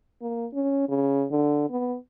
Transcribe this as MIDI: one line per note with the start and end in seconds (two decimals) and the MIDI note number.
0.22 0.46 58
0.54 0.89 61
0.89 1.25 49
1.31 1.66 50
1.70 1.96 59